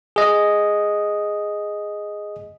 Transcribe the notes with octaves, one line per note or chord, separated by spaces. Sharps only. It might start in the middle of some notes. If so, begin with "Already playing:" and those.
G#4 D#5